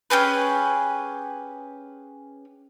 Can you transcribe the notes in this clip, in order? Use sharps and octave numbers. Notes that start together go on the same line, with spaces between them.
C#4 G4 G#4 B4